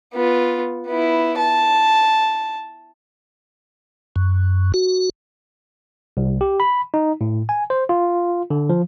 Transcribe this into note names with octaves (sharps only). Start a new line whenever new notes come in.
B3 F4
B3 E4
A5
F#2
F#4
C2
G4
B5
D#4
A2
G#5
C5
F4
D3
F3